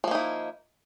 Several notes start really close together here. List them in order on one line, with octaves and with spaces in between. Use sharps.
F3 A#3 D#4 E4